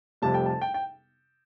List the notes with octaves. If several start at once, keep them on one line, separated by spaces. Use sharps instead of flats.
F1 F2 C3 G3 A5
G5
A5
G5
G5